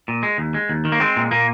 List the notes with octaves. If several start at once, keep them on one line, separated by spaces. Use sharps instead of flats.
A#2
G#3
D#2
G#3
D#2
D#3
A#3
G#3 C4
A#2
A#2 A#3